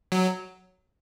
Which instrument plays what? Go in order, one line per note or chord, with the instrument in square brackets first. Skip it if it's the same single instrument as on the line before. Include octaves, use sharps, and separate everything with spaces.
[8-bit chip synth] F#3